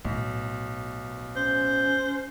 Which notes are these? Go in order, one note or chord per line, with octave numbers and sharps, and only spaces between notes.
B1 A2
C#4 C5